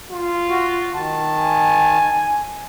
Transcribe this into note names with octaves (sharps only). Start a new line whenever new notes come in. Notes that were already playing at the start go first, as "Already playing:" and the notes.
F4
F#4
D#3 A5
G#5